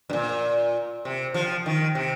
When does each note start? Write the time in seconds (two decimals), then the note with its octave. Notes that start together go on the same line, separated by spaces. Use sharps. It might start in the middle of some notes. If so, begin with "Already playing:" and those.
0.10 G2
0.13 A#2
1.05 C3
1.34 F3
1.66 D#3
1.95 C3